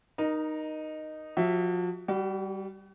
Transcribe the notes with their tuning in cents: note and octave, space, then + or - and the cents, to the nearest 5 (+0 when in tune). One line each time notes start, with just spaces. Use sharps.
D#4 -10 A#4 +20
F3 +35 F#4 +30 E5 +0
G3 +0 F#4 +45